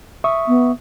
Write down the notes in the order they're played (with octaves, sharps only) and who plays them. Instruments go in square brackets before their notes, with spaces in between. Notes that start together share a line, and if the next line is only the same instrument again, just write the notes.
[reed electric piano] E5 C#6 D#6
[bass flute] B3